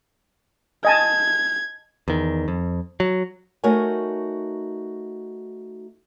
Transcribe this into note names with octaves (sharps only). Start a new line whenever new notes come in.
D#5 G#5 A5 G#6
E2 D#3
F2
F#3
A3 D#4 F#4 A#4 C#5 G#5